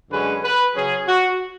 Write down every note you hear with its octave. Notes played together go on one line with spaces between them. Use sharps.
F#2 D3 G#3 C#4 B4
B4
C#3 F#3 C#4 G#4
F#4